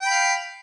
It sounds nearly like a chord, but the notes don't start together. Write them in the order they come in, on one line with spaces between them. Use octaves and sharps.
G5 B5 F5